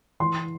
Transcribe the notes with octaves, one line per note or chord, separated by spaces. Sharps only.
E3 C6